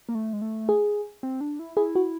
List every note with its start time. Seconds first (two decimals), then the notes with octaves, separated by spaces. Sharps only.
0.09 A#3
0.15 A3
0.33 G#3
0.42 A3
0.69 G#4
1.23 C4
1.41 D4
1.59 E4
1.77 E4 G#4
1.95 F#4